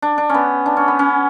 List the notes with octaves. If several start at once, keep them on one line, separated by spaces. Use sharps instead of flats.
D4
D4
B3 C#4
D4
C#4
B3
C#4